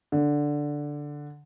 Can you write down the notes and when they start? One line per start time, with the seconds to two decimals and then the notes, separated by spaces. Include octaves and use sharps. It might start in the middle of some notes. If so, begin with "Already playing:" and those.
0.12 D3